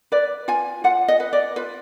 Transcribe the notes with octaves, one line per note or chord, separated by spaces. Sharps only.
B4 D5
F4 G#5
F4 F#5
D#5
B4
D5
F4 B4